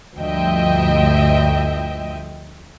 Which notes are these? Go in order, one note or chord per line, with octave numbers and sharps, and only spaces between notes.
D2 G2 F3 D#5 E5 G5